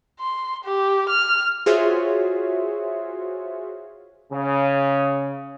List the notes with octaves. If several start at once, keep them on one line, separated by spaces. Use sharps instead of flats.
C6
G4
F6
F4 F#4 G#4 C5 C#5 E5
C#3